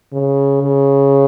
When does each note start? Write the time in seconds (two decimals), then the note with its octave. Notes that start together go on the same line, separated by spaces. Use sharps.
0.13 C#3
0.63 C#3